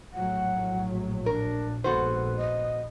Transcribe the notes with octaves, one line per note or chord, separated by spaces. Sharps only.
A#1 A2 F#3 F#5
D4 A#4
A#1 G#2 B3 F#4 A4 C5
D#5